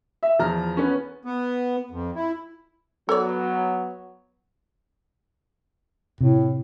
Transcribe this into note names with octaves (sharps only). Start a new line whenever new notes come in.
E5
E2 F3 A#5 F6
B3 C#4
B3
F2
E4
F#3 B3 A4 C#5 D5
A2 C3